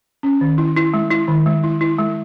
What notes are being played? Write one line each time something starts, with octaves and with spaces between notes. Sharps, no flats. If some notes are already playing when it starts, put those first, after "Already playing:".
C#4
D#3
E4
E4
G#3
E4
D#3
G#3
E4
E4
G#3